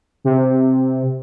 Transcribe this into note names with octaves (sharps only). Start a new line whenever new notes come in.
C3